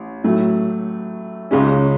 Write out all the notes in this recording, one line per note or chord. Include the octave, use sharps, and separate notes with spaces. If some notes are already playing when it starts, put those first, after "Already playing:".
Already playing: A1
A2 F#3 A3
C#2 C#3 G#3 C#4